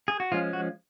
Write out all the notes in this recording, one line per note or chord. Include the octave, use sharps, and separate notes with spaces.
G#4
F#4
F3 G#3 C#4 F4
F#4